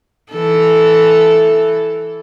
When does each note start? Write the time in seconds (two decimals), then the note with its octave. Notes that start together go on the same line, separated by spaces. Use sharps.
0.32 E3 A4